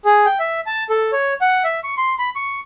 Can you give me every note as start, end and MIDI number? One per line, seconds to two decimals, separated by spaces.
0.05 0.25 68
0.26 0.38 79
0.40 0.60 76
0.66 0.84 81
0.90 1.11 69
1.12 1.34 73
1.41 1.63 78
1.64 1.80 76
1.84 1.94 85
1.97 2.14 84
2.19 2.30 83
2.36 2.60 85